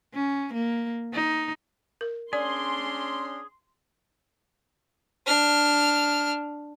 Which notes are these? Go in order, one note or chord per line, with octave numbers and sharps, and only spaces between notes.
C#4
A#3
D#4
A#4
C#4 D4 G#4 D5 C6
D4 F6